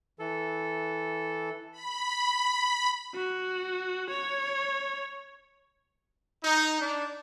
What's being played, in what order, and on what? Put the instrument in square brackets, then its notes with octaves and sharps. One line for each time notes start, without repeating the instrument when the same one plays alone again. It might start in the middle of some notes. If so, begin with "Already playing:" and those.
[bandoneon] E3 A4
[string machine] B5
[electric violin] F#4
C#5
[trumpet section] D#4
D4